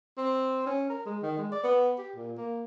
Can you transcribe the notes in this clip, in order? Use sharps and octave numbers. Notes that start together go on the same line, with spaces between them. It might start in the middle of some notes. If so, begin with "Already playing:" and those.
C4
C#4
A#4
G#3
D#3
G#3
D5
B3
G4
A#2
A#3